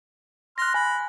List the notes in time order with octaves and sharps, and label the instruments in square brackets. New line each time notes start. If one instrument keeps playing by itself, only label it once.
[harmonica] C6 F6 [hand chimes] F#6 A#6
[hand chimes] G#5 [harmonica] B5